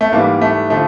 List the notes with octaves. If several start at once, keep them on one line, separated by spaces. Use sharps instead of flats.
A3
G#2 E3 G3 A#3
A3
D3 F3 A3